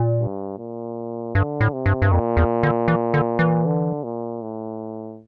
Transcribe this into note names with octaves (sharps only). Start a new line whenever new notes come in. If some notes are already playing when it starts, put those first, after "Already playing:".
Already playing: A#2
G2
A#2
G2 D3
A2
C3
G2
G2
F2 A#2
E2
D3
E3
D3
E3
D3
A#2
A2